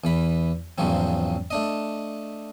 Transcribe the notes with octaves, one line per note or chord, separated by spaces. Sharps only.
E2 E3 B5
E2 G#2 C#3 F3 F#3 C4
A3 D4 D#5